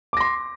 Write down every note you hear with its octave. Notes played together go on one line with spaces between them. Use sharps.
C6 D6 A#6